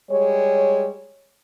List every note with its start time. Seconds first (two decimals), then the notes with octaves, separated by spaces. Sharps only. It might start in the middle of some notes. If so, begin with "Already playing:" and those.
0.10 G3 G#3 C#5